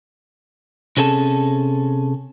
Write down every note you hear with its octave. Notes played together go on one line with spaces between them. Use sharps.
C3 C#4 G#4 A4 D#5 A5